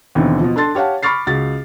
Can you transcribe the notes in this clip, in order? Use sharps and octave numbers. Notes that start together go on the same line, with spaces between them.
D#2 B2 D3 E3 C4
B2 F3
D4 A4 A5 C6 A6
G4 C#5 F5 F#5 A5
B5 C#6 D6 F6 A6 C7
C#2 F#4 A6